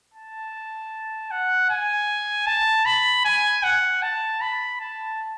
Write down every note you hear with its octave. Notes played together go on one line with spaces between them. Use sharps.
A5
F#5
G#5
A5
B5
G#5
F#5
A5
B5
A5